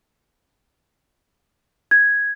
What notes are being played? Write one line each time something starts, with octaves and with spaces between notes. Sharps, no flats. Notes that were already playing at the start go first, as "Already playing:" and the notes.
G#6